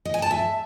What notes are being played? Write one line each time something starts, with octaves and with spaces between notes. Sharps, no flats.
D#5
G#5
A5
E5